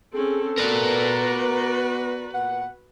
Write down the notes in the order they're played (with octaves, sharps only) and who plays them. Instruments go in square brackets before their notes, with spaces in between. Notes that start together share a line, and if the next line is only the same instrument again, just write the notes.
[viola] C4 C#4 [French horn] G#4 [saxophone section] A4
[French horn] B3 [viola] F#4 B4 [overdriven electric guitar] A#4 D5
[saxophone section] A#2 B3 F#5